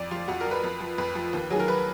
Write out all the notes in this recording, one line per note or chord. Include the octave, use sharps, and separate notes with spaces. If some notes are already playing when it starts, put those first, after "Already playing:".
Already playing: F2 D5
F3 F4
F2 F#4
A#4
F3 B4
F2
F3
F2 B4
F3
D#2
D#3 F#3 G#4 A#4
B4